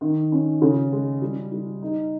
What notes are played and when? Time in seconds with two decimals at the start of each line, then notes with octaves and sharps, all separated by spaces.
0.01 D#3
0.32 C#4
0.62 C#3
0.92 G#3
1.22 G3
1.52 G3
1.82 D#4